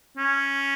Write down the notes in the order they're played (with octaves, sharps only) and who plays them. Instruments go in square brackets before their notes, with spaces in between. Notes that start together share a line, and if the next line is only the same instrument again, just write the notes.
[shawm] C#4